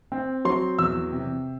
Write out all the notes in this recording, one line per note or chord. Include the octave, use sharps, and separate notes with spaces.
C4
F#3 C6
E2 E6
C3